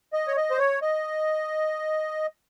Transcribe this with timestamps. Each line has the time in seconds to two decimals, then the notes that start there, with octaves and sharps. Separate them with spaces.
0.13 D#5
0.27 C#5
0.37 D#5
0.51 C5
0.59 C#5
0.82 D#5